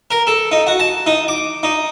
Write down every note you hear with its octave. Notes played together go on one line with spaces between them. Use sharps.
A#4
A4
D#4
F#4
A5
D#4
D6
D#4